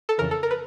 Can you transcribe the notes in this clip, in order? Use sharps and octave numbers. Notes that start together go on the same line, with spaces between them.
A4
F2 C#3 E3 A#4
A4
A#4
B4